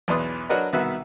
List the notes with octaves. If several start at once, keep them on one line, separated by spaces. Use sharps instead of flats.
B1 E2 B4 D5 C6 D#6
F#3 D4 F#4 A#4 B4 D#5
C2 B2 D#3 F#4 B4 E5